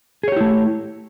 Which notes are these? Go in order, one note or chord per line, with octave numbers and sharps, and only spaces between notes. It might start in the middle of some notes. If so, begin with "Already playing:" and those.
A3 E4 G4 G#4 C#5